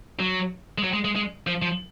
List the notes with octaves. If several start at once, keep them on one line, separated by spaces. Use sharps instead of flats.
F#3
G#3
F#3
G#3
G#3
G#3
F3
F3